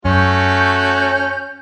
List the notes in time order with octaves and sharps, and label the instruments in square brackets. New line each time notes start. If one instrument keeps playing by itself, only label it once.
[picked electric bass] F#2 [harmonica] A3 F#4 [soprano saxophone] C#4 [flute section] G6